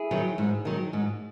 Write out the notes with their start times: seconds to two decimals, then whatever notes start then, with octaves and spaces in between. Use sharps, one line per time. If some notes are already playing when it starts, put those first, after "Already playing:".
Already playing: E4 G#4
0.11 D#3 F#3
0.38 G#2
0.65 D#3 F#3
0.93 G#2